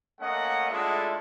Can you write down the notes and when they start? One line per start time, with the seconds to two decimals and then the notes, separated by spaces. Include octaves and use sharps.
0.20 A3 A#3 C#4 D#5 F#5
0.70 G#3 A3 D4 E4 F4 A4